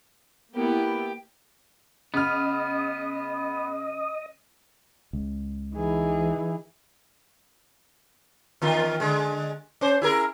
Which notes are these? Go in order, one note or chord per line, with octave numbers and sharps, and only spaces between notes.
A#3 B3 E4 G4
C#3 B3 D#5 F6
C#2
E3 D#4 G#4
E2 D#3 F4
D3 G#3
C#4 C5
E4 G#4 A#4